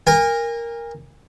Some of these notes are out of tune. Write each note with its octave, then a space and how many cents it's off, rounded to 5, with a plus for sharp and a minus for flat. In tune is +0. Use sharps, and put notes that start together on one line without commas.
A#4 +0 G#5 -40